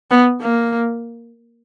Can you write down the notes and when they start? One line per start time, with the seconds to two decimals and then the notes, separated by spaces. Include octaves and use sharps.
0.11 B3
0.41 A#3